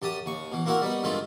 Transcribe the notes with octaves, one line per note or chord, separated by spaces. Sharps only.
F#2 G4 A5 D#6
D#2 C#6
B2 E3
A#3 C4 E4 F#4 A#4
G3 B3 D#4
G2 D#3 G#3 A3 C4 F4